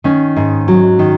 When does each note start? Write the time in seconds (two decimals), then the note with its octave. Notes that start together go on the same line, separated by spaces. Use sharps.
0.04 D#3 C#4
0.36 G#2
0.68 F#3
0.99 D#3